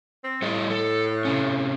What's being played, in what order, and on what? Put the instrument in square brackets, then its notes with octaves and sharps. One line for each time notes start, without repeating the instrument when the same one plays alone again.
[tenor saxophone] C4
[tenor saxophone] A2 [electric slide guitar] G3 A4 D#5
[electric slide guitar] A4
C3 C#4